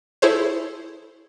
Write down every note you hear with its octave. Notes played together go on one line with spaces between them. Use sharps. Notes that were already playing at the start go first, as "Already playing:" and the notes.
E4 G#4 A4 C5 C#5